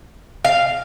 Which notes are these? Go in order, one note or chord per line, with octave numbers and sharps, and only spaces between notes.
F5